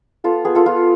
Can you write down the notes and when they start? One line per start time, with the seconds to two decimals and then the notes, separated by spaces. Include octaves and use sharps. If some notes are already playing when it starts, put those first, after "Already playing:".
0.24 B3 F4 A4
0.45 B3 G#4
0.55 F4 A4
0.66 B3 F4